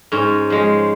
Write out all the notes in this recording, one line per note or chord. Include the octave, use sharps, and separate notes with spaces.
G#2 C#4
F3 G#3